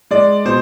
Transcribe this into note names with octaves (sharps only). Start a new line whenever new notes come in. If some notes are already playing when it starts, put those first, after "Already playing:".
G#3 D5
B2 C5